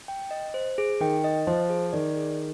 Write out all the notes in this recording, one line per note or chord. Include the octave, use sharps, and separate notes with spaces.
G5
D#5
C5
G#4
D#3 G5
D#5
F3 C5
G#4
D#3 D5
G#4